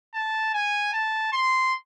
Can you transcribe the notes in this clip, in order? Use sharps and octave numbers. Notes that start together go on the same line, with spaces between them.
A5
G#5
A5
C6